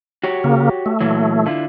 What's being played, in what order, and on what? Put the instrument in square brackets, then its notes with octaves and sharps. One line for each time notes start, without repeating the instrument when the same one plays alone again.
[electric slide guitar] F#4 G4 C#5
[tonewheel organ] C#3 A#3
A3
[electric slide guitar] A#2 E3 F#3
D3 E4 F4